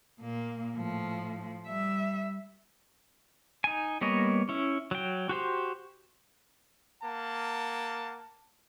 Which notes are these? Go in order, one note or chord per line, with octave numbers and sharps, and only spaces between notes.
A#2 A#3
A2 F3
G3 E5
D#4 G#5
G3 A#3 B3 C#5 D#5
C#4 E4
F#3 G5
F#4 G4 C5
A#3 F#5 A5